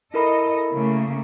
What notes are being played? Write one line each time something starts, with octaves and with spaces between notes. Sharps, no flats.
E4 A4 A#4 D#5 B5
C#3 A3 A#3